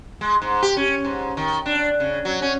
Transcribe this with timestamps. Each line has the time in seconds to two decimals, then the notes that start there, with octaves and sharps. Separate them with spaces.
0.21 G#3
0.42 G#2
0.62 G4
0.77 C#4
1.05 G#2
1.37 D#3
1.66 D4
2.00 C#3
2.25 F#3
2.42 C#4